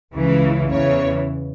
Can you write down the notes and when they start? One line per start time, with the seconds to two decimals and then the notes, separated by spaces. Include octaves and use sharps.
0.14 C#2 C#3 E3
0.70 E2 C#3 E3 C#5